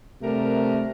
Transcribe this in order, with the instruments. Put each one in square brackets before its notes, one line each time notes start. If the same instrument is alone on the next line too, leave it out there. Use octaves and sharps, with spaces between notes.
[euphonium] C3 [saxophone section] G3 D4 A#4 [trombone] A3